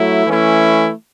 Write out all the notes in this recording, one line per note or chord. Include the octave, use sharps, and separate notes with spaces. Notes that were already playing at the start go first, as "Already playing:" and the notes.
Already playing: F#3 A3 E4
E3 A3 C#4 E4